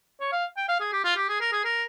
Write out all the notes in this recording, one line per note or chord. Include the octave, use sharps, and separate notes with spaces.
C#5
F5
G5
F5
G#4
G4
F4
G4
G#4
A#4
G#4
A#4